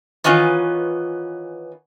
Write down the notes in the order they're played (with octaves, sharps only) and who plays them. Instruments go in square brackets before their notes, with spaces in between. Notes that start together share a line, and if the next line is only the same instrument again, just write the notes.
[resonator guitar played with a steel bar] D#3 E3 B3 C#4 F4